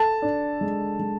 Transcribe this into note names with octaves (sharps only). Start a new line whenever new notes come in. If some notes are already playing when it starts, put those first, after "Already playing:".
Already playing: A4 A5
D4
G#3
G#3